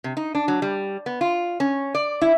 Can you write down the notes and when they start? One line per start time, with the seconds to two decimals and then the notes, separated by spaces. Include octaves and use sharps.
0.04 C3
0.17 D#4
0.35 D4
0.48 F#3
0.62 G3
1.06 B3
1.21 F4
1.60 C#4
1.95 D5
2.22 E4